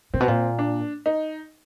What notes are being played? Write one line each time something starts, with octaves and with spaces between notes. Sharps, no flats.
A#2 C4
B2
A#2
D4
D#4